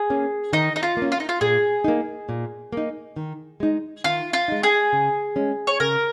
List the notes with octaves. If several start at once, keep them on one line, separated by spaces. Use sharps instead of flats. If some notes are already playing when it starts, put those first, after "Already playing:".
Already playing: G#4
A#3 C#4
D#3 D#4
D#4
F4
A#3
C#4
F4
D#4
F4
A#2 G#4
A#3 D#4
A#2
A#3 D#4
D#3
G#3 D#4
D#3 F4
F4
G#3 D#4
G#4
C#3
G#3 C#4
C#5
C#3 A#4